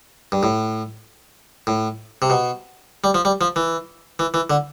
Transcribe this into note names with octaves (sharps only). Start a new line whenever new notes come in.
G2
A2
A2
C3
B2
G3
F3
G3
F3
E3
E3
E3
D3